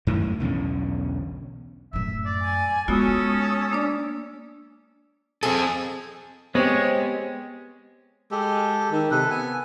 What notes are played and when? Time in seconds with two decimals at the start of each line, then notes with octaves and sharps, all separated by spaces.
0.07 F#2 A2 D#3 E3
0.40 B1 E2 D3 C#4
1.93 F#2 A2 E5
2.26 D5
2.41 G#5
2.88 G#3 B3 C#4 F4 F#4 A4 D#6
3.72 A#3 D4 D5
5.43 C4 G#4 A4
6.55 G#3 B3 C4 G4 C#5
8.31 G#3 G4 A4
8.91 D#3
9.11 C3 A4 B4
9.31 B3 G#5